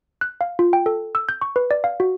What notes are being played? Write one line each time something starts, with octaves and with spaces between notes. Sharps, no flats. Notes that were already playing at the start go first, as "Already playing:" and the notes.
F#6
F5
F4
G5
A4
E6
G6
C#6
B4
D5
F5
F#4